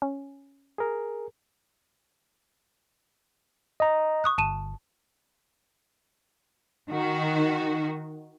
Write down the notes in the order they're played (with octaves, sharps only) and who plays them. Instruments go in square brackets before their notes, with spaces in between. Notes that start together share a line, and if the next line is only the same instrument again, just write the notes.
[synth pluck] C#4
[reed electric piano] G#4 A#4
[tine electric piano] D#5 A#5
[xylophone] C#6 D#6 F#6
[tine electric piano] G1 [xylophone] A5 D#7 E7
[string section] D#3 F#4